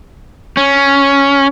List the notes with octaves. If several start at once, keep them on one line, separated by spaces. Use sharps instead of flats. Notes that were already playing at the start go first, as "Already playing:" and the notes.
C#4